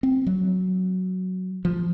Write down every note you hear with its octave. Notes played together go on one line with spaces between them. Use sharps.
C4
F#3
F3